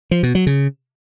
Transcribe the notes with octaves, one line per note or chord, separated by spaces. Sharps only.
F3
B2
F#3
C#3